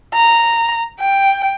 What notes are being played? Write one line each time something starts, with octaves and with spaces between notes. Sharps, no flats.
A#5
G5